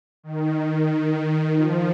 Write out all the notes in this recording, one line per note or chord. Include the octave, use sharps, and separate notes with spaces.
D#3
F3